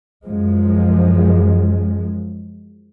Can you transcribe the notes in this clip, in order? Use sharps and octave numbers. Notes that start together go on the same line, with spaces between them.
F#2 F3 G#3